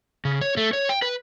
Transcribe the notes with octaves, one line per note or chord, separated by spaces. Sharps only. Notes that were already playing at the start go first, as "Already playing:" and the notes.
C#3
C#5
A3
C#5
G5
B4